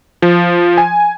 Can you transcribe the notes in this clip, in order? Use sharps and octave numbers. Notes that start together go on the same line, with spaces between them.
F3
G#5